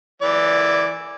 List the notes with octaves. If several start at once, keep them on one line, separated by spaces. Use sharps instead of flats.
E3 D5